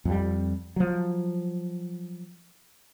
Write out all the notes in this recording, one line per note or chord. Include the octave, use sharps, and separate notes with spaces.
F2 G3
F3 F#3